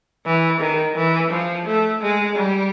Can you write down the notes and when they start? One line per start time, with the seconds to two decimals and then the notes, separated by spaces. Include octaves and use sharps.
0.26 E3
0.61 D#3
0.96 E3
1.31 F3
1.66 A3
2.01 G#3
2.36 G3